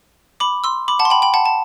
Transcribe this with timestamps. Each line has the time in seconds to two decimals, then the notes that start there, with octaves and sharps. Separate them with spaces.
0.40 B5 D6
0.64 C6 E6
0.88 B5 D6
0.99 F#5 A5
1.05 C6
1.10 G5 B5
1.22 G5 B5
1.34 F#5 A5
1.46 A5